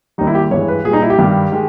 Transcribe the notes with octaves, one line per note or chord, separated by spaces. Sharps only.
D#2 D#3 G3 D#4
E4
G4
G2 E3 G#3 C#5
B4
A#2 G3 G#4
D#4
E4
G4
G2 D#3 G3
D#3 G#3